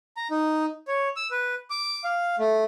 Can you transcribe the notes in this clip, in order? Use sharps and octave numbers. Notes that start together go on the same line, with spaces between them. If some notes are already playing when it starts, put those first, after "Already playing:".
A#5
D#4
C#5
E6
B4
D6
F5
A3